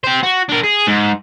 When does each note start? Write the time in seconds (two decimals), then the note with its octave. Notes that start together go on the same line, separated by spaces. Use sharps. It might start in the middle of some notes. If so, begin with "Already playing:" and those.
0.04 G4 C5
0.23 F#4
0.49 D4 A#4
0.63 G#4
0.87 G#2